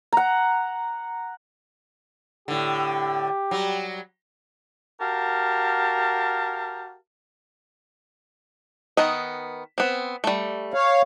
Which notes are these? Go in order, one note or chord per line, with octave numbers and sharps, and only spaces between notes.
F#5 A#5
A2 D3 G4
F#3 G3
F#4 G4 A#4 F5 A5
D#3 B3 D#5
B3 C4
G3 A3
C#5 F5